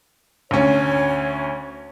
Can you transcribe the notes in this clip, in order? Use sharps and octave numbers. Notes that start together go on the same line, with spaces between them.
D2 C#4 C#5